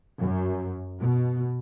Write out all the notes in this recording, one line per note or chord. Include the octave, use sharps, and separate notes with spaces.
F#2
B2